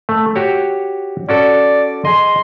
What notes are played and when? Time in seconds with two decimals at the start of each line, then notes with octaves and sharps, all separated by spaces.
0.09 A3
0.36 F#4 G4 C#5
1.29 C#4 F#4 A4 D5
2.05 G#4 D#5 C6